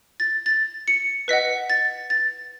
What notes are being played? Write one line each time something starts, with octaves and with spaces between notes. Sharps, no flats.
A6
A6
C#7
B4 D#5 F#5 B6
A6
A6